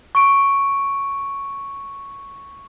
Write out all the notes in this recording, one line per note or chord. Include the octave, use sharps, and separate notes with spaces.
C#6 D7